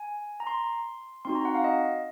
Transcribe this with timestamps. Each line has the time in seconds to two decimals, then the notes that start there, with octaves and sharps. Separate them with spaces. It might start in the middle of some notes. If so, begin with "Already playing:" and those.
Already playing: G#5
0.40 A#5
0.47 C6
1.25 C4 D#4 F#4 C6
1.35 A#5
1.45 F#5
1.55 F5
1.64 D#5